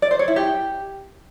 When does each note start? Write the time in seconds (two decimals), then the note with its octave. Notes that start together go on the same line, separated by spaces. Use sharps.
0.02 D5
0.11 C5
0.19 C#5
0.28 E4
0.36 G4